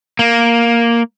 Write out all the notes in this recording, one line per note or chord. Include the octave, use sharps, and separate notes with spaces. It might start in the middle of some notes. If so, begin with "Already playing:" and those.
A#3